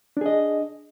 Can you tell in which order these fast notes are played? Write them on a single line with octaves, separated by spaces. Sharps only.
D4 G#4 D#5